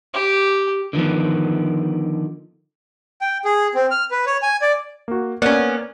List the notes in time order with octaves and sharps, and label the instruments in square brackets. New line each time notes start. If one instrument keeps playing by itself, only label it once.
[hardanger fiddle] G4
[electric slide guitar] D3 D#3 F3 B3
[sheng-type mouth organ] G5
G#4
C4
F6
B4
C#5
G#5
D5
[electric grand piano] A#3 F#4
[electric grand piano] A#3 D5 [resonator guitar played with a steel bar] B3 C#4